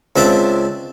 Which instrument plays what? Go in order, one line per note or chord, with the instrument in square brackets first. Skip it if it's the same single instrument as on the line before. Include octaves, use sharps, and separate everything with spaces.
[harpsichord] C#2 C4 D4 E5 A5